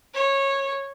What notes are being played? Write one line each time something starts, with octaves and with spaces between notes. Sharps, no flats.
C#5